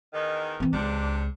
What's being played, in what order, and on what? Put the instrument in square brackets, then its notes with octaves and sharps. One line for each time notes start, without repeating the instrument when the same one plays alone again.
[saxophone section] E2 D#3
[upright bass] E3 C4
[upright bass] C#2 [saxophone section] C3 D4